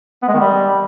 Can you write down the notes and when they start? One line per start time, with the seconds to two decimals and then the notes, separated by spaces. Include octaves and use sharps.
0.23 B3
0.28 G#3
0.34 D#3
0.40 G3